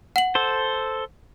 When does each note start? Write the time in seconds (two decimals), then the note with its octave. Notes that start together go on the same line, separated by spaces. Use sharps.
0.16 F#5 F#7
0.35 A4 C5